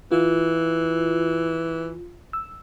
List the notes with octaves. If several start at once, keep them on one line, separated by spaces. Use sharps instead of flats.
E3 F4
E6